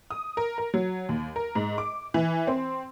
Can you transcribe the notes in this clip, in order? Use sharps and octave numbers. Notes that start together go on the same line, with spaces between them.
D#6
A#4
A#4
F#3
D#2
A#4
G#2
D6
E3
C4